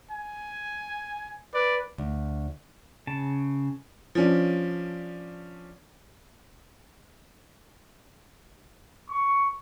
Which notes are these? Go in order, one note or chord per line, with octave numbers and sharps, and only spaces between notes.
G#5
B4 D5
D2
C#3 A5
F3 C#4 D4
C#6